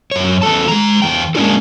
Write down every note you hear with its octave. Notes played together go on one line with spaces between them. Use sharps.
F#2 C#5
E2 E3 A4 A5
G#3 A#5
E2 G5
G#3 A#3 C#4 D4 F4 A4